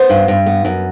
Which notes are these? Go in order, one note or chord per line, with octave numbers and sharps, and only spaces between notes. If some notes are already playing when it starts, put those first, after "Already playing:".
Already playing: B3 C5
G2
G2
B3
F#2